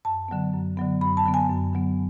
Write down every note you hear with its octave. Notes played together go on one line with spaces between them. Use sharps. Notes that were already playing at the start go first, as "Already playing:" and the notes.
F#2 A5
D3 F#3 B3
F#2
D3 F#3 B3
F#2 B5
A5
D3 F#3 B3
G#5
F#2
D3 F#3 B3